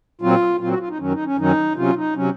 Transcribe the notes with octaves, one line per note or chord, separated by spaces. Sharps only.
A#2 F#3 C4 F4
A#2 F#3 C4 F4
F#4
F4
D#4
F#2 D#3 F#3 C#4
D#4
C#4
F#2 D#3 F#3 C#4 D#4
C3 F#3 C#4 F4
D#4
C3 F#3 C#4